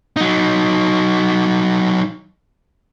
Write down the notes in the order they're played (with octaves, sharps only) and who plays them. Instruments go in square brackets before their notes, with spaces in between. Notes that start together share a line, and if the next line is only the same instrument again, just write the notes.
[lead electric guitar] F#3 D#4